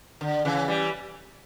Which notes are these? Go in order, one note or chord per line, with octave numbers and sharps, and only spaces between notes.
D3
C#3 E3
E3 G3